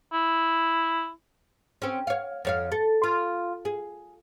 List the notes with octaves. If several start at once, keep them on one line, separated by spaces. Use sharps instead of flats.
E4
C4 C#4
C#5 F5
F2 C#5 F5
A4
F4
G#4